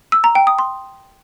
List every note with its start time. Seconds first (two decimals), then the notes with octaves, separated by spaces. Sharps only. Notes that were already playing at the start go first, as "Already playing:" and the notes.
0.12 E6
0.24 A#5
0.35 G5
0.47 D#6
0.59 C6